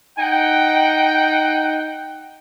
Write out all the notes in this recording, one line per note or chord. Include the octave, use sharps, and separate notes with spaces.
D#4 F#5 G5